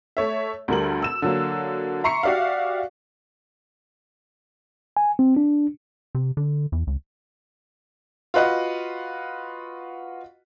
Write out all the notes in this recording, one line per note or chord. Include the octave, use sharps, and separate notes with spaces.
A3 C#5 E5
D2 D3 G3 A#4 F#7
E6 E7
D3 F#3 A#3
E5 A#5 C6 C#6 C7 C#7
F#4 G4 D5 E5 F5
G#5
C4
D4
C3
D3
E2
C#2
F4 F#4 B4 D#5 F#5